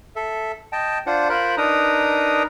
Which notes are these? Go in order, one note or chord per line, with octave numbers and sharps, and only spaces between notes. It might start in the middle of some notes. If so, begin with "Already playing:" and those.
A4 E5
D#5 G5 A5
D4 F4 C5 F#5
F4 A#4 C5 B5 F#6
D4 D#4 A#4 B4 A#5 D#6